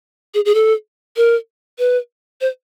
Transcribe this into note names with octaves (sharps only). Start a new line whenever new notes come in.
G#4
G#4
A4
A#4
B4
C5